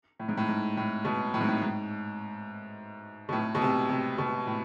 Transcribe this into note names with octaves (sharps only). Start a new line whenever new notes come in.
A2
G#2
A2
G#2
A2
B2
A2
G#2
A2
G#2
B2
A2
B2
C3
C3
B2
A2